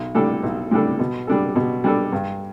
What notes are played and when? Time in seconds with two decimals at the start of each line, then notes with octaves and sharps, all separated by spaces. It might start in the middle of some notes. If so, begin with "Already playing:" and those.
Already playing: B1
0.15 A2 G3 D4 A4
0.43 B1
0.71 A2 G3 D4 A4
0.99 B2
1.27 G3 D4 A4
1.56 B2
1.84 G3 D4 A4
2.12 G2